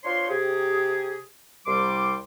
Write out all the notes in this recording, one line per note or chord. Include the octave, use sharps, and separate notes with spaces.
D4 F4 C5 C#5 C6
C3 G4 G#4
C2 G3 C6 D6